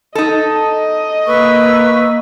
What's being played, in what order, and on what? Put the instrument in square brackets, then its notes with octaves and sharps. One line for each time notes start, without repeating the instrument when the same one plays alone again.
[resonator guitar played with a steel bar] D#4 A4 [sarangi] D#5
[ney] A#3 [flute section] B4 C#6 E6